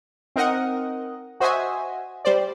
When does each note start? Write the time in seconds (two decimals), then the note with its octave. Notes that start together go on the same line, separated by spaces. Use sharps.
0.36 C4 D#4 A#4 D#5 F#5
1.40 F#4 C5 D#5 E5 G#5
2.25 G3 C5 D5